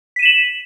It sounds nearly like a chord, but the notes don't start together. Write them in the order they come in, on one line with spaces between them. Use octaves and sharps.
B6 D#7 E7 F#7